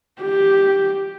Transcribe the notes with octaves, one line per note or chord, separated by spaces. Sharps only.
G4